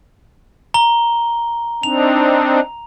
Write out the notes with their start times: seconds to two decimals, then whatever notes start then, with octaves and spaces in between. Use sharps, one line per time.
0.74 A#5 G7
1.83 C4 D4 D#4 F7